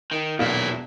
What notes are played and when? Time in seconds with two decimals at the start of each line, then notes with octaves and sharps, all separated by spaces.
0.11 D#3
0.39 E1 B1 A#2 D#3 E4 F5